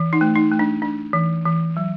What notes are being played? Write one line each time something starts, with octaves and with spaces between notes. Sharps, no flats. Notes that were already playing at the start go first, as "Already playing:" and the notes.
Already playing: E3
D#4
A3
D#4
A3
D4
D4
E3
E3
F#3